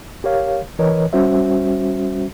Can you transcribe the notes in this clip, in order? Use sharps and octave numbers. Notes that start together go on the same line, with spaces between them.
G4 A#4 C#5 F5
E3 A#4 B4 C#5 D#5
G3 C#4 F#4 C5 E5